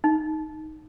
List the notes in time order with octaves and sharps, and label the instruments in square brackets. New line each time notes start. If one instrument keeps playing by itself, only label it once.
[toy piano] D#4